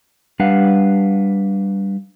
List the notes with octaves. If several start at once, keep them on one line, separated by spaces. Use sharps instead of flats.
G3 D4 B4 F5 F#5